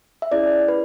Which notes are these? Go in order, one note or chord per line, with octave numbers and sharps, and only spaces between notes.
E5
C#4 E4 G#4 D5
B4